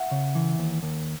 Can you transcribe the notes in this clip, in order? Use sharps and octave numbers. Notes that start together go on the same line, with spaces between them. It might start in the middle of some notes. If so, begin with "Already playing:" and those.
Already playing: E5 F#5
C#3
E3
D#2
D#2